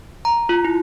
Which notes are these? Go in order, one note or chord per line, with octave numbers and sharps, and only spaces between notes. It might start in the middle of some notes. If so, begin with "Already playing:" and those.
A#5
F4
E4